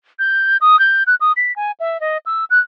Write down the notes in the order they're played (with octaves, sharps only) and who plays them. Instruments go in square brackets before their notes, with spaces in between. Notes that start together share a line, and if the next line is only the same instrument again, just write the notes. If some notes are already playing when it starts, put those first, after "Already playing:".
[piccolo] G6
D#6
G6
F#6
D#6
B6
G#5
E5
D#5
E6
F#6